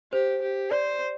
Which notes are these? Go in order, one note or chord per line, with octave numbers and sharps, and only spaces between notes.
G4 C5
G4
C5 D5